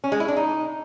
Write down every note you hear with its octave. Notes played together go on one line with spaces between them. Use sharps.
C#4
G#3
E4
D4
D#4